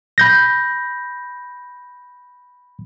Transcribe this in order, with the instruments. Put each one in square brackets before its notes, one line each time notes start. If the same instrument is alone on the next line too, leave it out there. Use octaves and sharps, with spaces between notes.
[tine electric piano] B5 G6 A#6